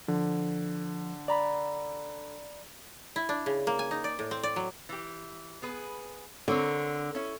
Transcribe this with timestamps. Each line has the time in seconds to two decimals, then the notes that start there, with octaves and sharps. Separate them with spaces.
0.08 D3 F3
1.28 D5 A#5 B5
3.16 E4
3.29 D4
3.46 C#3
3.67 A#3
3.79 G#5
3.91 D#4
4.04 D5
4.19 A2
4.31 C4
4.43 D5
4.56 F#3
4.89 E3 G4
5.62 B3 G#4 B4
6.48 D3 C4 A#4 C#5
7.15 C#4 E4